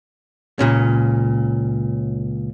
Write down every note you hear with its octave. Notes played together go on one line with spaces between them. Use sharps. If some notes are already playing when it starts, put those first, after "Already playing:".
C#2 A#2 C#4